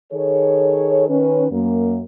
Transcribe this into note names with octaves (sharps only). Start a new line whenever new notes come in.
D#3 G#4 A4 C#5
D#3 C#4 B4
F#2 A#3